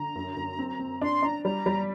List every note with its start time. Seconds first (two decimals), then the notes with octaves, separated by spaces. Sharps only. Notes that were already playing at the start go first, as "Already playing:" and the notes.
Already playing: D3 A#5
0.15 F#2
0.37 F#2
0.59 C4
0.80 C4
1.01 D4 C6
1.22 D4 A#5
1.45 G3 A#5
1.66 G3